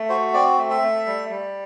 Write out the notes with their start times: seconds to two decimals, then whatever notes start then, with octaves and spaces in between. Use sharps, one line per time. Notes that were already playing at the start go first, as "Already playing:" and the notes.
Already playing: A3
0.09 F#4 C5
0.34 C4 D5
0.58 A3
0.70 E5
0.82 A3
1.06 G3
1.30 G3